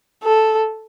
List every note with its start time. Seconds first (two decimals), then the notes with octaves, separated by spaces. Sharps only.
0.24 A4